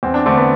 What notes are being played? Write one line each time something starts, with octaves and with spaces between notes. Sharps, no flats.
E2 C4
D4
D3 A3 C4
B3